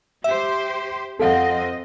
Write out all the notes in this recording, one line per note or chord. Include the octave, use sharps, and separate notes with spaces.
G4 C5 E5
F2 C4 A4 D#5 F5 F#5